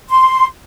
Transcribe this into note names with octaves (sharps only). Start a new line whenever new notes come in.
C6